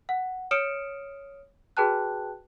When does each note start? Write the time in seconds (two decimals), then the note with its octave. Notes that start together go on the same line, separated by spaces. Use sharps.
0.09 F#5
0.51 C#5 D#6 F6 C#7 D7 E7
1.77 F#4 G#4 B4 G5 A5 F#6